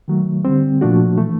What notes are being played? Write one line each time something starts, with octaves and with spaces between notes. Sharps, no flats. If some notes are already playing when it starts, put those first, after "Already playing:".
D#3 F#3 A3
D3 G3 C4
A#2 F3 A3 D4 F#4
E3 A3